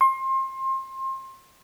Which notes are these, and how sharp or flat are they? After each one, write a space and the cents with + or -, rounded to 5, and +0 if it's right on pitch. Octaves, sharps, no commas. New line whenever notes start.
C6 +30